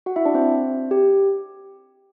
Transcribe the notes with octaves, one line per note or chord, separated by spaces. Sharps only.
F#4 F#5
E4 E5
D4 D5
C4 C5
G4